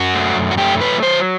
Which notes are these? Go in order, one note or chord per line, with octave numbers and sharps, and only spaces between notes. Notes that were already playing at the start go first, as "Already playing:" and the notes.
Already playing: F#2 F#4
A3
F#2
F#4
A3 G4
F#3 B4
F#3 C5